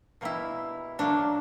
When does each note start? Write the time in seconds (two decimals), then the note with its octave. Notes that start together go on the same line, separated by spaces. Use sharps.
0.21 B2 G3 A#3 E4
0.99 A#2 F#3 A#3 D4